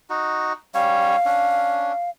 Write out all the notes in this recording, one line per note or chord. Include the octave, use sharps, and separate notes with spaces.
D#4 F#4
G3 C#4 C#5 F5
C#4 D4